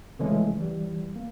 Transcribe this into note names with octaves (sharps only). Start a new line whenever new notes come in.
C#3 E3 F3 G#3 A3 C#4
E3 G3
A#3